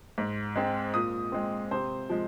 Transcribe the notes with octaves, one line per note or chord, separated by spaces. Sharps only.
G#2
G#3 C4
A#2 D#6
G#3 C4
C3 C5
F3 G#3